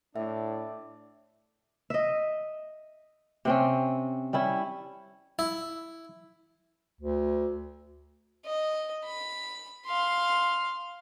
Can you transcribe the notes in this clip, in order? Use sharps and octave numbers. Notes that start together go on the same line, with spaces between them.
A2 D4 D5 E5
D#5 E5
C3 C4 C#4
G3 C#4 E4
E4
D2
D#5
B5
F5 C6